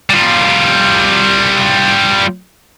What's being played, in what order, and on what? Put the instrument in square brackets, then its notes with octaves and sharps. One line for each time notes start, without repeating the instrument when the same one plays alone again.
[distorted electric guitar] G3 F4